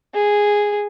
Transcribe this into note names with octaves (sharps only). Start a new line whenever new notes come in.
G#4